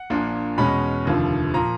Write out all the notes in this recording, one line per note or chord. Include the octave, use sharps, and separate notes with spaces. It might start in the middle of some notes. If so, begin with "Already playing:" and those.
Already playing: F#5
A#1 A#2 F3 A#3 D4
E2 B2 G#3 C#4 B5
F1 D#2 D3 F3
A#2 F3 A#5